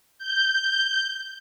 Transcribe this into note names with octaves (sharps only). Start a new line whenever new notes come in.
G6